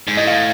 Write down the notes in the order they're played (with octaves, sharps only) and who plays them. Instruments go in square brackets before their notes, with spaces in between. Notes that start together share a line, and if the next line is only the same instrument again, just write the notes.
[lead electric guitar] G#2
[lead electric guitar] A2 [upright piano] D#5
[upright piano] F5